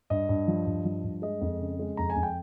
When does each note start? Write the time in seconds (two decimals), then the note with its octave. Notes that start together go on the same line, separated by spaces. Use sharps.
0.10 G2 D#5
0.29 G2
0.48 F3
0.66 G2
0.85 F3
1.03 G2
1.22 G#3 D#5
1.41 F2
1.61 C#3
1.79 G#3
1.97 F2 A#5
2.10 G#5
2.16 F2
2.23 G5